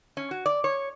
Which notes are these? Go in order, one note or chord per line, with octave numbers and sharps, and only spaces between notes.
C#4
F#4
D5
C#5